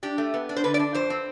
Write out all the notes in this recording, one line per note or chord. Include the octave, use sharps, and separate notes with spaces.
D4 G4
A3
B3
D4
C5
D3 B4
D5
D4
F2 C5
C4